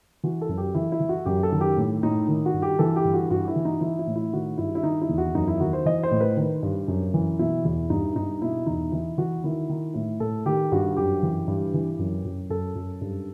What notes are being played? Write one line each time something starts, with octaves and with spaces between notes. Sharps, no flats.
E3 F#4
A4
F#2
G4
E3 E4
E4
E3
F#4
F#2 G4
A4
D#3
G4
A2
A2 D#4
D#3
F#4
G2
G4
E3 A4
G4
G2
F#4
G2 F#4
E4
E3
D#4
E3 E4
E4
A2
E4
D#3 F#4
G2 E4
E4
D#3 D#4
E4
E2
F#4
F#2 D#4
E4
D#3 F#4
C5
E3 D#5
C5
A2
B4
D#3
G2
F#2
E3
B2 E4
E2 E4
G2 D#4
G2 D#4
B2 E4
E2 D#4
E3 E4
E3 F#4
D#3 E4
D#3
A2 E4
A2 A4
D#3 G4
G2 F#4
F#2 G4
E3
G2
E3
F#2
F#2
F#2 A4
F#2
G2